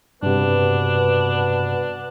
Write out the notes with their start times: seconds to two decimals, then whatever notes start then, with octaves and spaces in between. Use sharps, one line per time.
0.23 G2 C3 B3 D4 F#4 B4